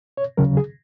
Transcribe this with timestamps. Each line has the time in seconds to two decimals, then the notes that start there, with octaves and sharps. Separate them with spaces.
0.17 C#5
0.37 D#2 C#3 F#3 A#4
0.57 G#4